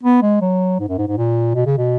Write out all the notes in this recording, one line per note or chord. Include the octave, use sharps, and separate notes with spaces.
B3
G#3
F#3
G#2
F#2
G#2
G#2
A#2
B2
C#3
B2